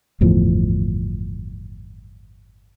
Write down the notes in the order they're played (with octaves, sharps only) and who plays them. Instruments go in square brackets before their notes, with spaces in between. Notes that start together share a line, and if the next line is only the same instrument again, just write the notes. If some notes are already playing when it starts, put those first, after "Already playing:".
[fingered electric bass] G1 E2 A2 F3